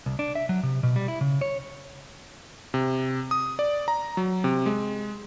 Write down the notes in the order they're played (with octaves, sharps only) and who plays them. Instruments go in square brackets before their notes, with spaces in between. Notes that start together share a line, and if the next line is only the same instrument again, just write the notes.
[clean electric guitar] C2
D4
E5
F#3
C3
B2
G3
E4
C#3
C#5
[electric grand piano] C3
D#6
D5
A#5
F#3
C3
G#3